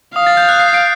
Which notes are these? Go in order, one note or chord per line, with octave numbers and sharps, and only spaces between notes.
F5 D#6
A6
G6
F#6
C7
D7